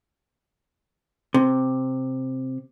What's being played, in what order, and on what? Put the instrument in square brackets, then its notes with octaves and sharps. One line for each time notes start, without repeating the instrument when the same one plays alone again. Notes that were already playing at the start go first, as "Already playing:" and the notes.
[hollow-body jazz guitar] C3